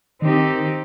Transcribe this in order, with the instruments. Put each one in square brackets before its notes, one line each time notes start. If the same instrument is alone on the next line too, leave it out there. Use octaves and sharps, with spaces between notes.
[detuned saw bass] D#3 [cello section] C4 D#4 G4